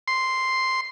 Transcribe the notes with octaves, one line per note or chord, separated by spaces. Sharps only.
C6